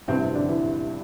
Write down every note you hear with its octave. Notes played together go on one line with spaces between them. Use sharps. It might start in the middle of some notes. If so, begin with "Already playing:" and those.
A1 G2 C3 E3 C4
C3 C4
D3 D4
E3 E4